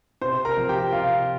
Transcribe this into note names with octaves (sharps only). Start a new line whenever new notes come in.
C3 C5 C6
A#4 A#5
F3 C4
G4 G5
C3 F4 F5